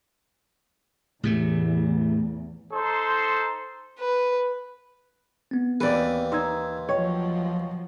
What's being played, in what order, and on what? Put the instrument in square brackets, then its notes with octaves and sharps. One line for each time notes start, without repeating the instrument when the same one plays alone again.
[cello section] E2 [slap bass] A2 C3 A3
[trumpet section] D#4 A4 C5 C6
[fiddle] B4
[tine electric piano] B3 C4
[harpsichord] D#2 E3 [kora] B4 D5
[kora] D#4 [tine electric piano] C6 E6 G#6
[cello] F3 F#3 [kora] C#5 [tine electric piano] D#5 G5 C#6